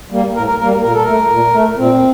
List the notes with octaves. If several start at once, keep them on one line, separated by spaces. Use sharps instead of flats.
G3 A#3
A2 A#4
A#4
G3 A#3 A#4
A#2 A#4
A4
A3 A#4
A#2
A3
A#2 C4